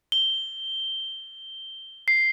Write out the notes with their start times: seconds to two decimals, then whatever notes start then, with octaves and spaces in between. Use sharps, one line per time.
0.12 G7
2.08 C7